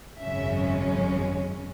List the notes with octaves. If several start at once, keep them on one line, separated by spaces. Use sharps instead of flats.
G#1 F#2 C#3 G#3 C#4 E5